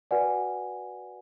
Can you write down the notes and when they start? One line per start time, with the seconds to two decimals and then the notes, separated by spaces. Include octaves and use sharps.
0.11 F#4 B4 D5 F#5 G#5